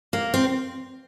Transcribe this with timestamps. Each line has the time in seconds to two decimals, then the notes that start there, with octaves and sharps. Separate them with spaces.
0.13 A#3
0.34 C4